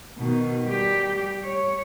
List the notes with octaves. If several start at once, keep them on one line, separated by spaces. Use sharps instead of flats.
B2 D#3
G3 G4
C#5